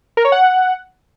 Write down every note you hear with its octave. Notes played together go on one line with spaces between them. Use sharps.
A#4
C#5
F#5